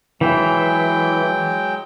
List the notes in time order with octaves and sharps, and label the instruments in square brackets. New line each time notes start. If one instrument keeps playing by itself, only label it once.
[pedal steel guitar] E3 [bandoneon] F#3 G#3 G5